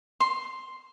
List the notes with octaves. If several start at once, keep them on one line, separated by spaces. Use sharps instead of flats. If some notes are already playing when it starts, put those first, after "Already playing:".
C6